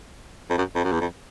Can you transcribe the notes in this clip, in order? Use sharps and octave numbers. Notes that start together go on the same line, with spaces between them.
F2
F#2
F2
F#2
E2
F2